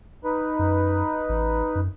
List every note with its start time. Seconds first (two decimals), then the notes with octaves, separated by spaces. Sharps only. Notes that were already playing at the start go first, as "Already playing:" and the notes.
0.24 D#4 B4
0.59 F#2
1.29 A1
1.75 F#2